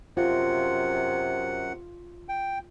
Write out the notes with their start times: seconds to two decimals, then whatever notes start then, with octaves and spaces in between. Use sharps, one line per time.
0.17 F#2 C3 F4 F#5
2.29 G5